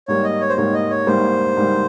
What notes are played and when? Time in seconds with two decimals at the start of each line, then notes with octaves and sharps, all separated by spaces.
0.08 G#2 G3 A#3 C#5
0.24 D#5
0.41 C#5
0.49 C5
0.57 G#2 G3 A#3 C#5
0.74 D#5
0.90 C#5
1.07 G#2 G3 A#3 C5
1.57 G#2 G3 A#3